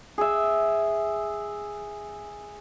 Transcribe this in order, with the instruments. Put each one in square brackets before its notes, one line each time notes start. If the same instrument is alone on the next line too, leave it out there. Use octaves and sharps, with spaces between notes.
[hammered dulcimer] G#4 E5